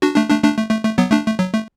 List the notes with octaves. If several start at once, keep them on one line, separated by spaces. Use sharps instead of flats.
D4 F#4
A3 D4
A3 D4
A3 D4
A3
A3
A3
F#3 B3
A3 D4
A3
F#3
A3